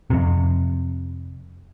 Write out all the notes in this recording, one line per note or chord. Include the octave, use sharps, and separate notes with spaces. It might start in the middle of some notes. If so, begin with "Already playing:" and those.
F2 C3